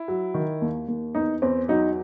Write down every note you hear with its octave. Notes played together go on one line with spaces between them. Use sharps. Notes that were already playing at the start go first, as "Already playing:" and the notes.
Already playing: E4
F#3
D#3
D#2
D#2
E2 D#4
E2 C4
F#3 D#4